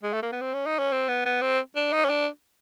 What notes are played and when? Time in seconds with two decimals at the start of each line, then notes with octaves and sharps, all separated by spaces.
0.03 G#3
0.13 A3
0.22 A#3
0.32 B3
0.41 C4
0.53 C#4
0.66 D#4
0.79 C#4
0.92 C4
1.09 B3
1.25 B3
1.42 C4
1.76 D4
1.93 D#4
2.05 C#4
2.09 D4